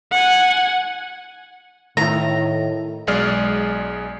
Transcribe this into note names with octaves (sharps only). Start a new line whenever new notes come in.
F#5 G#5
A2 D#3 A3 E4 A#5
B1 G#3 G#4 D5 F6